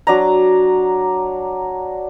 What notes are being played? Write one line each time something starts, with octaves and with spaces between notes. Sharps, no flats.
F#3 D4 A#5